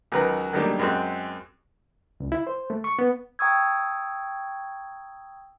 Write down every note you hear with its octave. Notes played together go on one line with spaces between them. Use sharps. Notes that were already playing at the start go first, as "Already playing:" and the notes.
C#2 D#3 F#3 B4 A#5
D#3 F#3 G3 A3 A#3 D4
F#2 G#3 C4 F#4 F#6
C#2
E4
C5
A3
C#6
B3
G5 A#5 C#6 D#6 E6 G#6